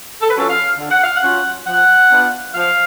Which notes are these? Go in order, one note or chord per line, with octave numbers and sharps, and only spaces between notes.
A4
B4
F#3 C#4 F4 A4
F5
D3
F#5
F5
F#5
F#3 C#4 F4
F3 F#5
B3 D4 F4
F3 F5